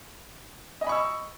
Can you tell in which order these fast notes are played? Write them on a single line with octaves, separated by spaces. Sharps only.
D#5 G#5 B5 C#6 E6